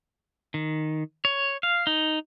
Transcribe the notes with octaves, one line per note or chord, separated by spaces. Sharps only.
D#3
C#5
F5
D#4